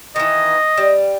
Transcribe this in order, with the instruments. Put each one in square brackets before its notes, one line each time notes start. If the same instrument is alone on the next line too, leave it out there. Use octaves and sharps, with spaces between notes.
[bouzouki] D#3 E3 [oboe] D#5
[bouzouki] G3